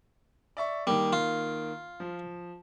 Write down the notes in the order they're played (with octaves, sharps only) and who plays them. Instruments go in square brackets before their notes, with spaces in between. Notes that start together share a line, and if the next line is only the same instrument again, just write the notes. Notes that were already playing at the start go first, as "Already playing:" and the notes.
[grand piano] D5 E5 C#6
[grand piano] D#3 A#3 [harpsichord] G3
[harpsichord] F4
[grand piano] F3